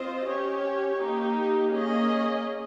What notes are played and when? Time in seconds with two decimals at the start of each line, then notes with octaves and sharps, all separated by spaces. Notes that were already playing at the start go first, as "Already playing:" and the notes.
Already playing: C4 F4 C5 D#5
0.25 C#4 G4 C#5
0.98 A#3 D#4 G4
1.71 A#3 C#4 G#4 D#5